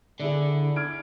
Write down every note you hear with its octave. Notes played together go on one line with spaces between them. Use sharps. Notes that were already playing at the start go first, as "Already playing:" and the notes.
D3 D4 E4 G#4
F6 G#6 D7